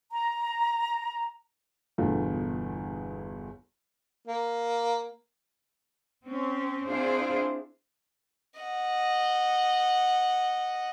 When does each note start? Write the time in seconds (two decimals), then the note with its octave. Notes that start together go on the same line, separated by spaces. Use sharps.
0.12 A#5
1.98 G1 E2 B2 D3 F4
4.28 A#3
6.25 C4 C#4
6.88 C4 D4 E4 F4 G#4 C5
8.60 D#5 F#5